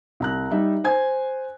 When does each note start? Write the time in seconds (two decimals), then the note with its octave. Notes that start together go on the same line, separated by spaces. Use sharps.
0.20 C2 A#5 F#6
0.51 G3 D#4 E5
0.84 C5 G#5 G#6